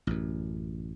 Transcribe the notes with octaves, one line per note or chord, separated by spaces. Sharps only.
A1 F#2